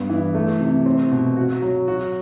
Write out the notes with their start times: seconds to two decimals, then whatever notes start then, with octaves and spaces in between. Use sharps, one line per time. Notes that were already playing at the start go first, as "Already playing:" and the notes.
Already playing: G2 B3
0.10 E3
0.35 A3
0.60 C3
0.86 C4
1.11 B2
1.37 F#4
1.62 F#3
1.88 F#4